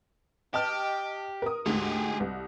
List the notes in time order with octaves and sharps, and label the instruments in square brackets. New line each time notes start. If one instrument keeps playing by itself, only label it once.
[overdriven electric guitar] G4 [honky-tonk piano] D#5 A5 F6
[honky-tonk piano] A#4 D#6
[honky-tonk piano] D2 G#2 [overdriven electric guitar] G4 G#4
[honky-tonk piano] C2